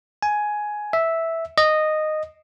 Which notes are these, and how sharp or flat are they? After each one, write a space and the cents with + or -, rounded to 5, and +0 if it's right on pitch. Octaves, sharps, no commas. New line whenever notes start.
G#5 +10
E5 -5
D#5 -10